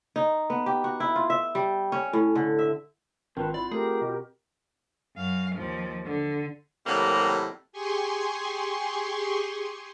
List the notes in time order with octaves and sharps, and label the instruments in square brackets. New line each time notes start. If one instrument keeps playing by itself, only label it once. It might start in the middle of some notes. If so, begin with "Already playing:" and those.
[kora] D#4
B3
G4
F#4
E4
F4
E5
G3
C#4
A2
D3
E5
[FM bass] G#1 [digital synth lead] D#3 [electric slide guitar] C4 F4 F#4 [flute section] B4 A5
[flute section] E4 B5 [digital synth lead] D5
[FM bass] A3 [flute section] G4 A#4 [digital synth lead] G#4
[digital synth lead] B2
[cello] F#2 F5
D#2 F3
D3
[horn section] A2 C3 D#3 F#3 G3 A#3
[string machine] G4 G#4 G#5 C6 C#6